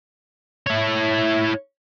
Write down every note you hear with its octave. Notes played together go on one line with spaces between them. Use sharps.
E4 C#5